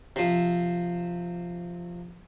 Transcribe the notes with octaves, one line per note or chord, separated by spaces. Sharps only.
C3 F3